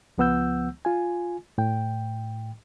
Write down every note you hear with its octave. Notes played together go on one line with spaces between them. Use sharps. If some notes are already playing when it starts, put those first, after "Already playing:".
C#2 F3 B3 F#5 E6 G6
F4 G#5
A2 G5